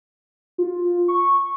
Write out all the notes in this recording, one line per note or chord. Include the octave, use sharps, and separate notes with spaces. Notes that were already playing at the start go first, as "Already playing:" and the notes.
F4
C#6